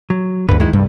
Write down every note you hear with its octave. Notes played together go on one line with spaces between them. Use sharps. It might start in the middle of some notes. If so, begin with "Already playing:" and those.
F#3
D2 G2 D3 B4
D#3 G#3 E4
C2 G2 G3